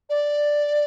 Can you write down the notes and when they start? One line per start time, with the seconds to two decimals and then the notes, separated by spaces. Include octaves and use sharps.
0.09 D5